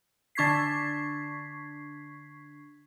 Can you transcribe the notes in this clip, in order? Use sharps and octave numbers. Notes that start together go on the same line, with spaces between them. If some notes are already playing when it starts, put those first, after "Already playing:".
D3 D4 C#6 G#6 B6 C7